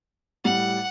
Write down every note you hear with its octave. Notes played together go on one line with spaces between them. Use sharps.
A2 G3 F#5